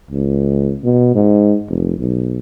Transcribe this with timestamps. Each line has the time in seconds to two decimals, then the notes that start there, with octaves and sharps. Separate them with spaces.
0.11 C#2
0.84 B2
1.15 G#2
1.69 F1
1.99 B1